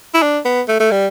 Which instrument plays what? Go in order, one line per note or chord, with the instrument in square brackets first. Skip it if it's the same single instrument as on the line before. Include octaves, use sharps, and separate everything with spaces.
[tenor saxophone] E4
D4
B3
A3
A3
G3